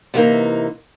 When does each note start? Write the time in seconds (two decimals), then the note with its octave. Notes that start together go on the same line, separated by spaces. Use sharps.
0.14 C3 E3 G3 A#3 D#4